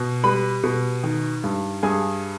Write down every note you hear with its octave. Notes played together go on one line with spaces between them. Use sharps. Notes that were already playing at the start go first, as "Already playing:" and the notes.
Already playing: B2
G3 B4 B5
B2
D#3
G2
G2 G#4 G#5